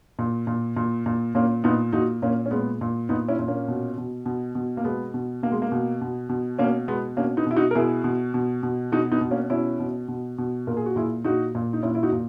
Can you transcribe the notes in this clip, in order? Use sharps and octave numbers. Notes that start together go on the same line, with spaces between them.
A#2
A#2
A#2
A#2
A#2 A#3 C#4
A#2 B3 D#4
A#2 D#4 F#4
A#2 A#3 C#4
C#4
A#2 G#3 B3
A#2
A#2 B3 D#4
C#4 E4
A#2
A#3 C#4
B2
B2
B2
B2
A#3
B2 G#3 B3
B2
B2 A#3
G#3
A#3
B2
B2
B2
B2 A#3 C#4
B2 G#3 B3
B2 A#3 C#4
B3 D#4
B2 E4
D#4 F#4
A#4
B2 E4 G#4
B2
B2
B2
B2 D#4 F#4
B3 D#4
B2
A#3 C#4
B2 C#4 E4
B2
B2
B2
A#2 A#4
G#4
F#4
A#2 E4 G#4
A#2 D#4 F#4
A#2
D#4
A#2 C#4 E4
E4
D#4 F#4
A#2